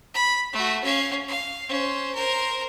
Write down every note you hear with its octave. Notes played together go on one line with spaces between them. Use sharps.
B5
A3 F#4
C#4 F5
F5
C#4 C5
A#4 C5